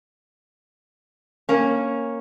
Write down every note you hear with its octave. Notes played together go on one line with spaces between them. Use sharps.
A#3 C#4